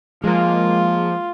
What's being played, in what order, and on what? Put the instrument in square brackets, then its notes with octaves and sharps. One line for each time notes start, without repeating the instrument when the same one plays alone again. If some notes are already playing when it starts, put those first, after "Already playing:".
[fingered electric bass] F3 [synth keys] G#3 A#3 [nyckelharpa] F4